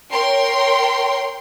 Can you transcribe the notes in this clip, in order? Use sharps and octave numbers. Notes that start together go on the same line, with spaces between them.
A#4 C#5 G5 C6